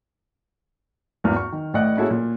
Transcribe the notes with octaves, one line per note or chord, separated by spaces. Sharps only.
G#1 E2 F6
C#6
D#3
A1 A2 D5 D#5 F#5 F#6
A#3 C#4 E4 F#4 G#4 A4
A#2